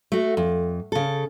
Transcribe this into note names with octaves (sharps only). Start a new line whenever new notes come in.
A3 F#4
F2
C#3 A4